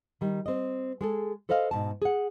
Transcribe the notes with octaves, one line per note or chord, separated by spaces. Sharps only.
D#3 G3
C4 D#5
G#3 G#4 A4
A4 B4 C5 D#5 F5
G#2 B2 A5
G#4 F#5